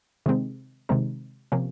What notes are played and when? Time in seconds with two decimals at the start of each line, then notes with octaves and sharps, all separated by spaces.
0.26 C3 D#3 G#3 C4 D#4
0.89 C3 D#3 G#3 C4 D#4
1.52 C3 F3 A#3 C#4